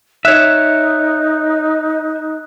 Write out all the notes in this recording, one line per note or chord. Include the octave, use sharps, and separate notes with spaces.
D#4 C#5 E5 F#6